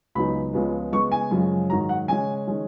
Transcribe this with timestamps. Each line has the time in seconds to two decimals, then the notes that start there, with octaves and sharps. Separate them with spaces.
0.15 C#2 C#3 F#3 B3 D#4 B5
0.53 C#2 C#3 F3 G#3 B3
0.92 C#3 G#3 B3 C#6
1.12 G#5
1.31 F#2 C#3 F3 G#3 C#4
1.70 G#2 D#3 F#3 A#5
1.89 F#5
2.08 C#3 G#3 C#4 G#5
2.48 D#3 G#3 C#4